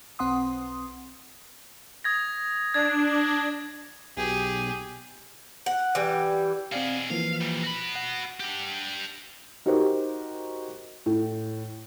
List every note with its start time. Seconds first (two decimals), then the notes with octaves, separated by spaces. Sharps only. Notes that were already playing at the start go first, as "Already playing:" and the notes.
0.19 B1 C4 F#5 C6 D#6
2.04 D#6 G#6 A#6
2.74 D4 G#6
4.17 B1 G4 G#4
5.66 F#5
5.95 E3 G3
6.72 B2 C4 G#4 D5 F5
7.10 E3 F3 A#3 F5
7.41 A#2 G3
7.63 F#4 B5
7.96 F#5
8.40 D4 G4
9.66 D#4 F#4 G4 A#4 C5
11.06 A2